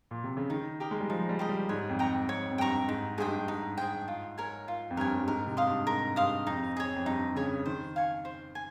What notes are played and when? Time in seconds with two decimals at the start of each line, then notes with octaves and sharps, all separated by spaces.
0.11 A#2
0.24 C3
0.37 C#3
0.50 D#3 D#4
0.80 G4 A#4 D#5
0.91 G#3
1.00 G3
1.10 F3 D#4
1.29 G3
1.39 G4 A#4 D#5
1.49 G3
1.69 G#2 C#5
1.89 F2
1.99 G5 A#5 C#6
2.29 F2 C#5
2.51 F2
2.58 G2 G5 A#5 C#6
2.88 G#2 D#4
3.18 G2 G#4 C5 G5
3.28 G#2
3.38 G2
3.48 G#2 D#4
3.77 G#4 C5 G5
4.08 F4
4.38 A#4 C#5 G#5
4.68 F4
4.90 F2
4.97 G2 A#4 C#5 G#5
5.18 G2
5.27 G#2 A#4
5.47 C3
5.57 F5 C6 D#6
5.67 G2
5.87 G#2 A#4
6.16 G2 F5 C6 D#6
6.46 F2 D#4
6.77 G#4 C#5
6.96 F2
7.06 G2 D#4
7.36 C#3 G#4 C#5
7.66 D#3 C5
7.96 F5 G#5 C#6
8.25 C5
8.55 G#5